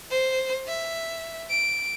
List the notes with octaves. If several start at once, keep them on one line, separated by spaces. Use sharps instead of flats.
C5
E5
D7